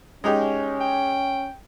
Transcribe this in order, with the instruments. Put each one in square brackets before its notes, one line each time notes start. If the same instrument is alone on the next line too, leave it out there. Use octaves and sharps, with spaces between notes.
[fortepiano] G#3 D#4 G4 [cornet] C#4
[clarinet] G5